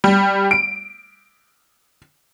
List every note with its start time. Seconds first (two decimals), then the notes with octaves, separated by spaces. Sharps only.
0.04 G3
0.51 D7